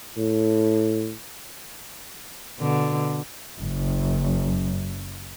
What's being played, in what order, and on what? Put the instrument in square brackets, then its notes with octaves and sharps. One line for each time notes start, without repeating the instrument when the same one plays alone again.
[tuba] A2
[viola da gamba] B2 D3
[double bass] F#1 F#2